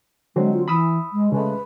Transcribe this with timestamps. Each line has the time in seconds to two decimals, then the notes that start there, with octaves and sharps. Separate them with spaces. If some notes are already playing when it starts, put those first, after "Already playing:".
0.36 D3 F#3 G#3 C4
0.53 F4
0.68 E3 B5 D#6 E6
1.13 G#3
1.32 C#3 G#3 A3 B4